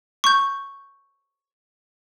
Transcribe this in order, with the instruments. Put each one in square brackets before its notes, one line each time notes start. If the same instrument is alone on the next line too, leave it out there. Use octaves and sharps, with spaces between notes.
[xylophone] C#6 G6